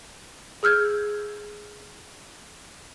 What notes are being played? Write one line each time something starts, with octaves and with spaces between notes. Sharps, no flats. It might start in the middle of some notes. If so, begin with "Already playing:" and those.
G#4 E6 F6 G6 G#6